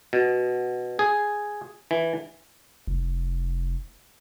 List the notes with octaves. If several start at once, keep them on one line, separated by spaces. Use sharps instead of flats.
B2
G#4
E3
F1